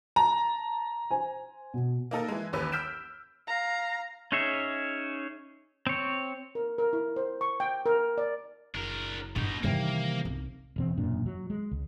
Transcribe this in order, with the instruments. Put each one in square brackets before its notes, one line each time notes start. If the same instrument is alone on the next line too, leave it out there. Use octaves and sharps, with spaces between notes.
[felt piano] A5 [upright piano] A#5
[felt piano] C5 G#5
B2
[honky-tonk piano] A#3 D#4 A4 A#4
E3 G#3
A1 D#2 C#4 B4 E6
E6 F6 G6 B6 D7 E7
[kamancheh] F5 A#5
[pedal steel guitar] C#4 D#4 G#4 C#5 E5
C4 C#5
[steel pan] A#4
A#4
E4
C5
C#6
G5
A#4
D5
[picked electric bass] F#1 [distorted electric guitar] D4 A#4
[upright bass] G2 [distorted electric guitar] B2 D#4
[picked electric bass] C3 E3 G3 [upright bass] D#3 D#4 [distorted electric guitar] A#3
[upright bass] C2
[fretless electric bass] E1 E2 C4
E1 F#2 A#2 D4
F#3
G#3
C#2